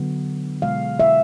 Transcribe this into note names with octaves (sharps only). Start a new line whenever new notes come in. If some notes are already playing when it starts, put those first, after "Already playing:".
Already playing: D3 F#3 B3
B2 G#3 B3 F5
E5